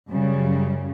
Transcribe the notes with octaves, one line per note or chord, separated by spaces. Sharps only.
F#2 C#3 G3